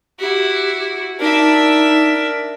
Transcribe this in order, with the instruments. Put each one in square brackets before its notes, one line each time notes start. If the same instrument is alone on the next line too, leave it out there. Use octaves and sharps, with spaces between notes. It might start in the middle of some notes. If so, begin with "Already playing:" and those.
[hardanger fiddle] E4 F#4 [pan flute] G4
[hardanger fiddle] D4 E5 [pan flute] D#4 [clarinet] A#4